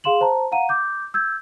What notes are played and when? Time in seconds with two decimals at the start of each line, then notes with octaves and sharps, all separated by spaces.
0.04 G#4 F5 C6 E7 F#7
0.21 C5 A5 A#5
0.52 F5 F#5 A#5 D#7
0.69 D6 G6
1.14 E6 G6 G#6